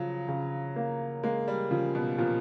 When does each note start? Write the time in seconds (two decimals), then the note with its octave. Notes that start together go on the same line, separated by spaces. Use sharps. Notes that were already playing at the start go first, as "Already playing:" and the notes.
Already playing: C#3 F3 F#3
0.28 C#3
0.76 A#3
1.23 G#3 A#3
1.48 G3
1.71 C#3 F3
1.95 B2
2.18 A#2 F3